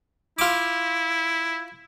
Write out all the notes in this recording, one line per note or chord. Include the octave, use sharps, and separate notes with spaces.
E4 F4 D6